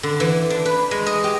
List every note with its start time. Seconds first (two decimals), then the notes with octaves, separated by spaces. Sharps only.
0.03 D3
0.20 E3
0.50 D4
0.65 B4
0.91 G#3
1.06 D#5
1.24 G4